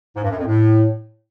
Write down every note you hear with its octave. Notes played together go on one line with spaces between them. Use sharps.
G#2
G2
F#2
F2
A2